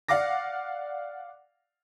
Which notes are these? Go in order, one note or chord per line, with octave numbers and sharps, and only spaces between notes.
D5 F5 F#5 D6 A#6